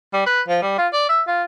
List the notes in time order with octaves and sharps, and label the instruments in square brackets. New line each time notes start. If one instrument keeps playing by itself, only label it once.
[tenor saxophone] G3
B4
F3
G3
F4
D5
E5
F4